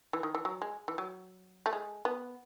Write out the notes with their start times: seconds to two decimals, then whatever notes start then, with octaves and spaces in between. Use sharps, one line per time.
0.13 E3
0.23 D#3
0.35 E3
0.45 F#3
0.62 G#3
0.88 E3
0.98 F#3
1.66 A3
1.73 G#3
2.05 B3